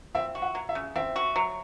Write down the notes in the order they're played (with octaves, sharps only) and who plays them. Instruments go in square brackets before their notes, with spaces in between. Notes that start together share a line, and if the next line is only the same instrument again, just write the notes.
[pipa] C4 [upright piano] E5
[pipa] F#4
[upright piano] F#5
[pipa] F#3
[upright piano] E5
[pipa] C#3
[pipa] C4 [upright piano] E5
[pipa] F#4
F#3